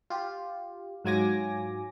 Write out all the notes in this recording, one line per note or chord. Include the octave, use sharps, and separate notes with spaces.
F4 G4
G#2 F#3 F4 G#5 D6 A#6